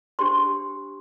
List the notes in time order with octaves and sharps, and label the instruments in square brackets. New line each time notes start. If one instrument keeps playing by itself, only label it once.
[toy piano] D4 G4 C5 C6